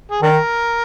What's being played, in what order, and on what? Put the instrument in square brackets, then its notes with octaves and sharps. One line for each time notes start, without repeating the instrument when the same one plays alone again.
[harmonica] G#4
[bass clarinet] D#3 [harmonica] D4 A#4